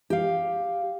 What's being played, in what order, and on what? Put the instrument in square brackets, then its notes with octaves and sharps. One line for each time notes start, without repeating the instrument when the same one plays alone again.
[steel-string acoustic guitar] G4 F5